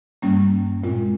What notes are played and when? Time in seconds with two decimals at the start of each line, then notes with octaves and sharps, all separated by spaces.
0.22 G2 G3 A#3 C#4
0.84 A#2 G#3 C4 F4